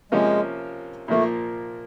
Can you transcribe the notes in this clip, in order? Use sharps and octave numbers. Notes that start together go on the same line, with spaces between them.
C3 F3 G#3 A#3 C#4
A#2 F3 A3 A#3